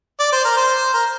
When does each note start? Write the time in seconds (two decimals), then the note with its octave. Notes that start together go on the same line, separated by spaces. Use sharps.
0.20 D5
0.32 C5
0.45 A#4
0.57 C5
0.94 A#4